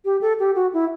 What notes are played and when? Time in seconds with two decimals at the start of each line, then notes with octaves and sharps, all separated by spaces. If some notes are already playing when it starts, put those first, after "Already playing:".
0.05 G4
0.21 A4
0.39 G4
0.55 F#4
0.73 E4